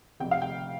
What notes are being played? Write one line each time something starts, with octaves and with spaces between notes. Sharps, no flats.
F1 F2 C3 G5
F5
G5